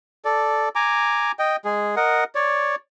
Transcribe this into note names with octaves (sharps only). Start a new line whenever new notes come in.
A4 D5
G#5 A#5 D6
D#5 G5
G#3 G#4
A#4 D#5 F#5
C#5 D5